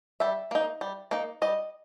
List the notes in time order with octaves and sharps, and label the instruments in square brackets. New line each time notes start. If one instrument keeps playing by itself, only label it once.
[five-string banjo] G3 E5
A#3 D#4
G3
A#3 D#4
G3 D#5